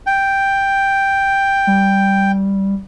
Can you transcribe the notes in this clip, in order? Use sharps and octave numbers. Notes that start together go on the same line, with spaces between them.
G5
G3